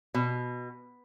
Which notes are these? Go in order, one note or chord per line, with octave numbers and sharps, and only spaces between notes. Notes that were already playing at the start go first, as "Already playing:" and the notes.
B2